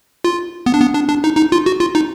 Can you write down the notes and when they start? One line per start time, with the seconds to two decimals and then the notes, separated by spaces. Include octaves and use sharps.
0.24 F4
0.66 B3
0.74 D4
0.81 B3
0.94 D4
1.08 D4
1.24 D#4
1.37 D#4
1.52 F4
1.66 F#4
1.80 F4
1.95 D#4